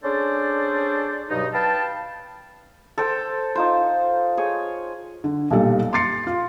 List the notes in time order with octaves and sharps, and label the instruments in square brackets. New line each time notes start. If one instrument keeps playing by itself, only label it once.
[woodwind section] C#4 D4 G#4 A4 C5 D5
G2 B2 F#3 D#4
B4 F5 G5 A5
[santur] A4 C5 G5
D#4 F4 C5
G#4 C#5
[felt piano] D3
B1 A#2 G3 A4
C6 D6 A6 C7 C#7
F4